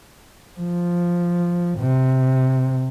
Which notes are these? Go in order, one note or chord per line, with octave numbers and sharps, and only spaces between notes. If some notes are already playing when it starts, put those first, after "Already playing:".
F3
C3